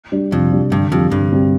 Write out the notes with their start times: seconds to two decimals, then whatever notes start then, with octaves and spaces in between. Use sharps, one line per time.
0.12 G3 D4
0.32 F2 C3
0.52 G3 D4
0.71 G2 D3
0.91 F2 G3 C4 G4
1.11 G2 D3
1.32 G3 C4 G4